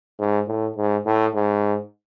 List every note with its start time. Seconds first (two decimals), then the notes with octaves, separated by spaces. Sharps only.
0.19 G#2
0.48 A2
0.76 G#2
1.06 A2
1.35 G#2